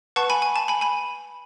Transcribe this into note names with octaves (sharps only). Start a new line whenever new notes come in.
B4 F#5 A5 C#6
G#5 B5
G#5
A5
G#5 B5
G#5 B5